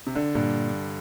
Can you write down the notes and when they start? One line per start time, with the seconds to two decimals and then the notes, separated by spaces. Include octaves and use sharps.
0.07 C3
0.15 D3 D4
0.35 G2 A#2